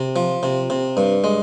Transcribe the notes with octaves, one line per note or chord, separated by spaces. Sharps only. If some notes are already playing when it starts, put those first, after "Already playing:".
Already playing: C3
F3
C3
C3
G2
G#3